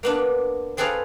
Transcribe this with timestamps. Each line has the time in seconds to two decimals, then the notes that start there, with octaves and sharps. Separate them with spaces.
0.03 A#3 B3 D4
0.77 C4 G#4 A4 B4 D5 F5